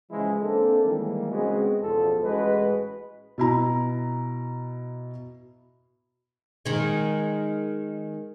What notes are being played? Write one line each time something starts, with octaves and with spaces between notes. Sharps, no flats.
C#3 E3 F3 G#3 E4
A#3 C4 D4 A4
D#3 E3 G3 G#3 A#3
C#3 G#3 B3 C4 F#4 G#4
A1 E2 B2 F3 A4
A1 G#3 F#4 B4
B2 E4 A#5
D#3 G#3